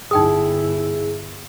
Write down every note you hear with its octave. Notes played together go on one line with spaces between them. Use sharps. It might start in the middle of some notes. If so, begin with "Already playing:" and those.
G1 D#4 E4 G#4 G5 D#6